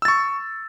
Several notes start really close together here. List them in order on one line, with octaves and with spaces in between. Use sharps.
E6 A6 C#6